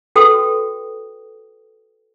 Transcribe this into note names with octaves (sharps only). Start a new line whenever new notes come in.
F#4 A4 B4 G5 D#6